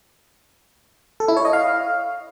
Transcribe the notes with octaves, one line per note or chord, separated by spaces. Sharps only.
A4
E4
C#5
D#5
F5